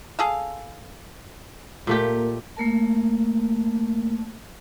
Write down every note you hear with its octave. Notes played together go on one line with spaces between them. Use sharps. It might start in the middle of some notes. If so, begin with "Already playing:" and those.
G#4 A4 F5
A#2 A3 A#3 G4
A3 A#3 A#4 A5